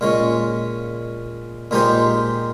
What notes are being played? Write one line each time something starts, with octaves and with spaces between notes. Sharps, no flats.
A#2 G#3 C#4
A#2 G#3 D#4 G4 C5